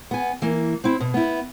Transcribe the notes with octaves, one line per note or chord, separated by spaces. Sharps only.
B3 G#5
E3 A#3
C4 E4
B2
B3 E4